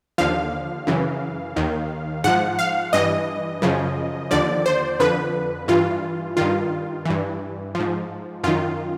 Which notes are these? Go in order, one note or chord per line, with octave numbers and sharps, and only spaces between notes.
D#2 D3 F3 F5
F#2 C#3 E3
D#2 D#3
G#2 F3 F#5
F5
G2 E3 D#5
F#2 C#3 F3
D#2 D3 F3 D5
C5
F2 D3 F3 B4
G2 E3 F4
G2 D#3 F4
G2 E3
F3
G#2
F#2 D#3 F4